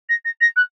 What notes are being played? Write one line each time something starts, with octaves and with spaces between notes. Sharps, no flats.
A#6
A#6
A#6
F#6